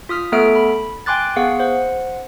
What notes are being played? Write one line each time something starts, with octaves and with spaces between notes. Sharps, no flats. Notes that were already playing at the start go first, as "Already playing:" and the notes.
F4 D#6 F6 B6
A3 B3 A4 E5 F6 D7
B5
G5 G#5 C6 D6 F#6 A6
B3 G#4 F5 F#5
C5 F#5